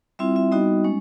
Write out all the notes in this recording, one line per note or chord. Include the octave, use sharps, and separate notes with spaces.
G3 C4 E4 F4 E5
E4 E5
G3 B3 D#4 F#4 D#5
G#3 C#4